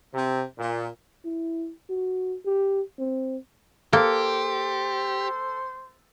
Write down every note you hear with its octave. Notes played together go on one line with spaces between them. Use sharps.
C3
A#2
E4
F#4
G4
C4
A#3 G4 A4 C5